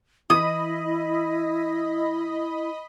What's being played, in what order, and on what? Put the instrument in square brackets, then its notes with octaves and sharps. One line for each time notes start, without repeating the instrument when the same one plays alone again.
[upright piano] E3 D#7 [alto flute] E4 [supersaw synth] D#5 B5 [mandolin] D#6